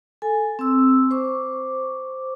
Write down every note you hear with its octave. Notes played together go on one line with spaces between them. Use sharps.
A4 G#5
C4 E6
C5 C#6 D6